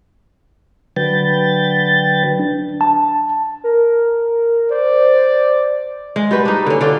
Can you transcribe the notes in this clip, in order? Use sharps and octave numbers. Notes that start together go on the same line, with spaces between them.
D3 F#3 B4 G5 A6
D4
A5
A#4
C5 D5
G#3
G3 F#4 B4
D4 D#4
D3 C#4
D3 F4 D5